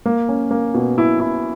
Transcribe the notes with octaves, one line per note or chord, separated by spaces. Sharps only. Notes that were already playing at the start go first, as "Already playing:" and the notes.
A#3
C#4
A#3
B2
E4
E4